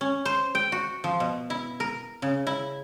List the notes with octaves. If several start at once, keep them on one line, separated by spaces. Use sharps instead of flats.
C#4
C5
G5
F#4
F3
B2
E4
A#4
C#3
E4